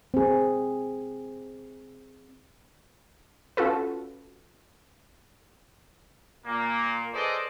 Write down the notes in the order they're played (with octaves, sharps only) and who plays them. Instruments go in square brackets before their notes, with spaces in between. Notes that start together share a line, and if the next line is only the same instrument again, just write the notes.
[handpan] C4 G#4
[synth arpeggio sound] C#4 F4 F#4 A4 B4
[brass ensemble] A#2 A#3
G#4 A4 B4 C5 D5 D#5